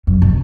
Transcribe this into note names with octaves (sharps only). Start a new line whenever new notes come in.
F#2
B2